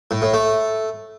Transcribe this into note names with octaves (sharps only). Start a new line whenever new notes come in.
A2
A2
A3